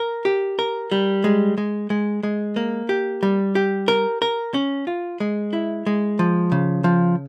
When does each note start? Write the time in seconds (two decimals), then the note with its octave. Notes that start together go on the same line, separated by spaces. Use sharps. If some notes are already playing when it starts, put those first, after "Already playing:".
Already playing: A#4
0.25 G4
0.59 A#4
0.92 G3
1.24 G#3
1.58 G#3
1.90 G#3
2.23 G#3
2.56 A#3
2.89 G4
3.23 G3
3.55 G4
3.88 A#4
4.22 A#4
4.54 C#4
4.87 F4
5.20 G#3
5.53 E4
5.87 G#3
6.19 F3
6.52 C#3
6.84 F3